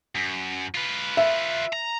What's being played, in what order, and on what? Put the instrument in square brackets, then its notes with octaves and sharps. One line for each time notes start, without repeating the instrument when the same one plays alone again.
[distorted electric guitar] F#2
F4 B4
[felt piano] E5
[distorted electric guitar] A#5